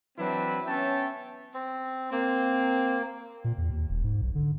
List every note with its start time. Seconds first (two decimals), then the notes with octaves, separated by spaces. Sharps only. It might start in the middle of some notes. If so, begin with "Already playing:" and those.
0.18 E3 F#3 C4 D4 E4 B4
0.66 B3 C#4 C#5 E5 G5 A5
1.54 C4
2.12 A#3 C4
3.44 A#2
3.58 E2
3.70 D#2
3.90 D#1
4.04 G#2
4.21 B1
4.35 D3